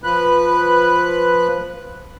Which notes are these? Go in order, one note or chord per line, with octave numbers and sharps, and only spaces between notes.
F3 B4 F#6